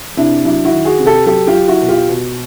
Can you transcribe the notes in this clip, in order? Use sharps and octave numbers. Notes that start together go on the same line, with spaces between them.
C3 D4 E4
F#3 D4 E4
E4 F#4
D#3
F#4 G#4
C3
G4 A4
F#3 G4 A4
F4 G4
F#3
E4 F#4
B2
F4 G4
B2